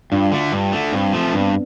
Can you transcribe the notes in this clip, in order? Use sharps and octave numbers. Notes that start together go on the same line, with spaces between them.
G2 D4 F4
D3 A3
G2
D3 A3
G2 C4
F3 A3 C4
G2 B3 D4